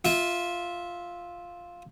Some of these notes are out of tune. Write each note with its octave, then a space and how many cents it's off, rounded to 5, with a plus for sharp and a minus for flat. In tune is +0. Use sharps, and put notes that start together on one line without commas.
F4 +0 E5 -15